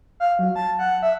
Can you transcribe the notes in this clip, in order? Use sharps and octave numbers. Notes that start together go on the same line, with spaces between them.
F5
F#3
A5
F#5
E5